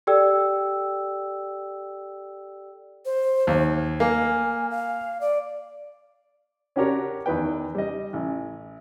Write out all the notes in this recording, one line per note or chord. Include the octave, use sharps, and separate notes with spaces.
G4 A4 D5 G5 E6
C5
D#2
A#3 G#5
F5
D5
C#4 D4 F#4 G4 A#4 C#5
E2 D#3 B4 G5
G3 D#5
A1